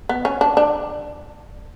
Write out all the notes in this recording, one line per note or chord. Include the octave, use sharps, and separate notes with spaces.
B3
C#4
D4
D4